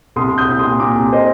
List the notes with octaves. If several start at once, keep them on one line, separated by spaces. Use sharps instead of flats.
C2 C6 D#6
C2
D#6 G6
C2
C6 D#6
A#2
A#2 A#5 D6
C2
C5 D#5